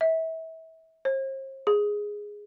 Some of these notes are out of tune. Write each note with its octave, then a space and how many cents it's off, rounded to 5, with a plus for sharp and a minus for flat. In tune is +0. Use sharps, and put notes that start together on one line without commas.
E5 -30
C5 +40
G#4 -5